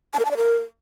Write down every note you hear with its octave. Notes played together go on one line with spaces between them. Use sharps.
A5
A#4
A5
D5
A#4